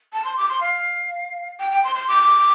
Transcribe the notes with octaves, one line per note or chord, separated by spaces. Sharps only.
A5
C6
D6
C6
F5
G5
G5
C6
C6
D6